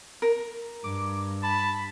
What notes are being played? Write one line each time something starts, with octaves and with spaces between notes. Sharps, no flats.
A#4
G2 D6
A5 B5